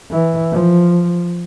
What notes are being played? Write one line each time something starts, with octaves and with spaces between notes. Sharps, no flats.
E3
F3